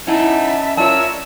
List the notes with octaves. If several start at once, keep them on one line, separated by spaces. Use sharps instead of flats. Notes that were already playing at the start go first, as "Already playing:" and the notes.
C#4 D#4 E4 D#5 E5 F#5 A5 B5
F4 A#4 C#5 D5 E5 A5 E6